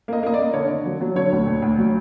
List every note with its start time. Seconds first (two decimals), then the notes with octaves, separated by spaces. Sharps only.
0.08 A#3 D#5
0.23 A#3 D#5
0.34 D5
0.38 A#3
0.53 D3 C#5
0.69 D3
0.86 F#3
1.01 F#3
1.15 D3 C#5
1.32 D2
1.46 D2
1.62 D2
1.78 F#3